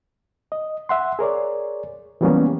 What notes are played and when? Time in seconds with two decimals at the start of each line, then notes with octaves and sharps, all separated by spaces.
0.52 D#5
0.89 E5 F#5 C6
1.19 G#4 A#4 C#5 D5
2.21 E3 F#3 G3 A#3 B3 C#4